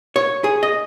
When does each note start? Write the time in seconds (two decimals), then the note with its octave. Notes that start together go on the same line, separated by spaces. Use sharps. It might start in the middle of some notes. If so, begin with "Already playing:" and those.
0.16 C#5
0.44 G#4
0.63 D#5